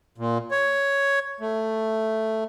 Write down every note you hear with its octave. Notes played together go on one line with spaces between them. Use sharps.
A#2
C#5
A3